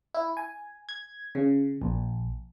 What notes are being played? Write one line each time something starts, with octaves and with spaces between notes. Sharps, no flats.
E4
G#5
G#6
C#3
A#1